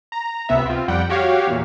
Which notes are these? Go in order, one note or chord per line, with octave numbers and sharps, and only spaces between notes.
A#5
C#2 C3 B3 E5
C4 F4
F2 G3 F#5 G5
F#4 G4 C#5 F5
E2 A#2